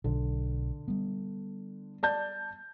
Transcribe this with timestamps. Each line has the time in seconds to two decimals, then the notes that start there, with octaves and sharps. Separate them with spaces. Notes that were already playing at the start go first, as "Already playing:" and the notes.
0.04 B1 D3
0.88 G3 B3
2.03 D5 A5 G6